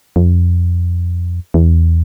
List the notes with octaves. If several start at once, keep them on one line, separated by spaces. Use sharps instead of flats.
F2
E2